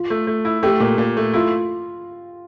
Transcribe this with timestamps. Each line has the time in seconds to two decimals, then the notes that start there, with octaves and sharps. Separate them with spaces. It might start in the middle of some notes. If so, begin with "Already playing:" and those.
Already playing: F4
0.10 A3
0.27 A3
0.45 E4
0.63 A3 G4
0.80 A#2
0.98 A#2
1.17 A3
1.33 E4 F4